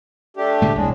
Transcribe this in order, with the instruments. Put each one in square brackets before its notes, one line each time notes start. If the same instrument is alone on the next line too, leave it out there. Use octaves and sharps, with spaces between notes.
[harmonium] A3 D4 G4
[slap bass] A2 D3 G#3
[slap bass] E1 C2 [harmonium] A2 G#3 D4